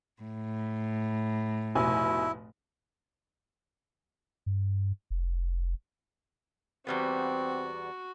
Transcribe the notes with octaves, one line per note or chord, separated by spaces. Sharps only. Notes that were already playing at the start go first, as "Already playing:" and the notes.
A2
F1 B2 E4 G#5
G2
F1
E2 G3 B3 C4 F#4